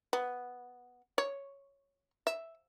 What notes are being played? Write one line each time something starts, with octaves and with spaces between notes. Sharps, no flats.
B3
C#5
E5